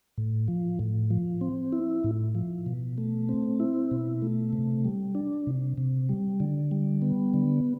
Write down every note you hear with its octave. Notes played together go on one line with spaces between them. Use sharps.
A2
F3
A2
F3
C4
E4
A2
F3
B2
A3
C4
E4
B2
A3
C3
G3
D4
C3
C3
G3
D3
G3
B3
D3